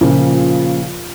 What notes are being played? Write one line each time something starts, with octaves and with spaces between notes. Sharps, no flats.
A#2 C#3 F3